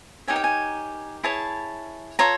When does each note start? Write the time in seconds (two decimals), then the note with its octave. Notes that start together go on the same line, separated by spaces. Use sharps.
0.28 D#4 G4 A#4 C#5 G#5
0.36 G5
0.44 G#5
1.23 E4 G#4 C#5 A5
2.19 F4 A4 C#5 A#5